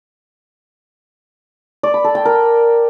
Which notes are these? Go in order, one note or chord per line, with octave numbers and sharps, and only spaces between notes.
D5
B5
A4
G5
A#4